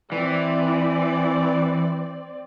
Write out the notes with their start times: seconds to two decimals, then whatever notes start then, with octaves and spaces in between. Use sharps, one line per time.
0.12 E3 C4 D5